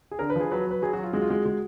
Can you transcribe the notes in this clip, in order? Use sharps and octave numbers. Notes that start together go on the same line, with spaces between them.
G#4
D3 A#4
B4
F3 G#4
F#3 B4
F#3 B4
F#3 G#4
F#4
F#3 F4
G#3 F#4
F4
G#3 F#4
G#3